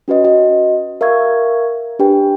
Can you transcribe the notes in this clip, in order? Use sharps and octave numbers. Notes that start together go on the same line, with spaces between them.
C#4 F#4 B4 D#5
F#4 D#5
A#4 E5 F5 C#6 G#6
D4 G4 B4 G5